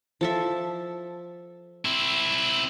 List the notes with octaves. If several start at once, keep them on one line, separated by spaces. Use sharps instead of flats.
F3 A4 E5
C4 E4